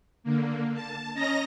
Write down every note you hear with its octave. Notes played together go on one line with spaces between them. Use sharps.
D3 A#3
A5
C#4 D#5 A#5 A#6